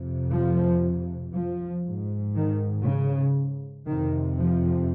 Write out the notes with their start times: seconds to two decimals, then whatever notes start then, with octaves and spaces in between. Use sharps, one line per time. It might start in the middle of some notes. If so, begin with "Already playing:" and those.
Already playing: F2 C3
0.32 F3
1.34 F3
1.85 G#2
2.35 D#3
2.85 C#3
3.87 F2 C3 D#3
4.37 F3